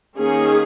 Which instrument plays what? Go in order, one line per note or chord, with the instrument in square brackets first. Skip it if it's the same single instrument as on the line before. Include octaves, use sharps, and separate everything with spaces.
[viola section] D#3 A#3 C#4 G#4